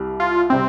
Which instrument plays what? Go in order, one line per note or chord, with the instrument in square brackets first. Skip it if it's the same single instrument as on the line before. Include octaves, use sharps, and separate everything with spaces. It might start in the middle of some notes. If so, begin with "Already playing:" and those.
Already playing: [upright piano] C2 G3
[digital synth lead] F4
[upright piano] C3 G3 [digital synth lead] C4